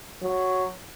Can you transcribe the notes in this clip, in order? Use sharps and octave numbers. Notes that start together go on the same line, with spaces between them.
F#3